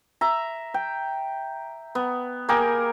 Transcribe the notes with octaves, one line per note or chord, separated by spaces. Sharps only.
E5 A#5
G5
B3
A#3 G4 G#4 A#4